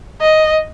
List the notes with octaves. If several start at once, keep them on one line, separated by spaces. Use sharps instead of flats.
D#5